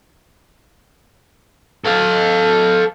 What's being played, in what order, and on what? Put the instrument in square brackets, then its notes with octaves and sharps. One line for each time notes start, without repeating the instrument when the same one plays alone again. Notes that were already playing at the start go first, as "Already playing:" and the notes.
[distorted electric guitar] A4 F5